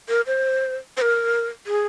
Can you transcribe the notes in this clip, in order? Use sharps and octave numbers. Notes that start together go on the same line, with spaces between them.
A#4
C5
C5
A#4
G#4